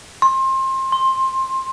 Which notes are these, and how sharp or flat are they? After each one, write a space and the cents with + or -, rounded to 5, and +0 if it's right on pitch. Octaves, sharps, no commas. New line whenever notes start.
C6 +25
C6 +15